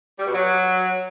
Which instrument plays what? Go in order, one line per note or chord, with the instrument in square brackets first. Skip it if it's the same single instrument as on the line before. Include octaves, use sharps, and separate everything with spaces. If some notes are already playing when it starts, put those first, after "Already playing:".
[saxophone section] G3
B2
F#3